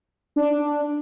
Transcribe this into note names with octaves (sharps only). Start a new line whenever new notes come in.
D4